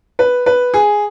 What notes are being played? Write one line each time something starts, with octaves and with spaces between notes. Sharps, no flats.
B4
B4
G#4